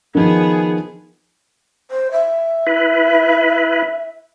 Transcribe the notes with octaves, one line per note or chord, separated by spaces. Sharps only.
D#3 F3 B3 G#4
C5
E5
E4 B4